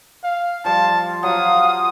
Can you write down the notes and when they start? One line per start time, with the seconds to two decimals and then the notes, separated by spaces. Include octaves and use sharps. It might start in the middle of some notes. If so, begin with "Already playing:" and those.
0.24 F5
0.65 F3 G3 F5 A5
1.23 F3 F#3 F#4 F5 D#6